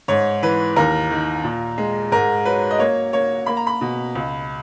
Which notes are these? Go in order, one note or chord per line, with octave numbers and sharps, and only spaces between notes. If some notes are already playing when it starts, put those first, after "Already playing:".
G#2 C#5
E3 B4
D#2 A#4
D#3
A#2
G#3
G#2 A#4
F#3 B4
D#5
A#3 C#5
A#3 C#5
A#3 B5
A#5
B5
B2
C#2